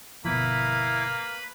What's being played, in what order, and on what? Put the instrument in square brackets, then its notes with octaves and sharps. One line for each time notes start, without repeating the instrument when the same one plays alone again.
[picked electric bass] G1 B2 F3 [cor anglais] A#3 [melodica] E4 [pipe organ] B4 B5